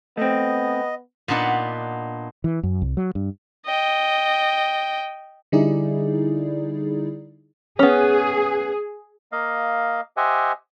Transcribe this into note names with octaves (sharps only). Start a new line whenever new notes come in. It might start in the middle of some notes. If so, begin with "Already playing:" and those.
A3 B3 C4 D#5
A#2 B3 D4 D#4 F#5 B5
E3
F#2
C2
F#3
G2
D#5 G5
D3 G3 D#4 E4 G#4 D5
B3 C#4 G#4
A#3 D#5 F5
G4 C5 D#5 E5 F#5 G#5